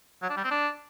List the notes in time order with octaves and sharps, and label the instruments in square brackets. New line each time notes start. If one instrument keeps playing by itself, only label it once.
[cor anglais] F#3
D4
G3
C4
D4